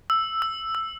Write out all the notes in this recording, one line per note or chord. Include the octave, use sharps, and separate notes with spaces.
E6
E6
E6